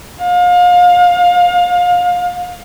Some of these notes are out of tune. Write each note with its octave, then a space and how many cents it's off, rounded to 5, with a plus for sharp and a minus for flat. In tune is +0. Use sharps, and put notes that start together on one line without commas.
F5 +30